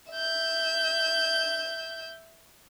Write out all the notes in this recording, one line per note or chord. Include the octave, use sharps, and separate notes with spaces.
E5 G6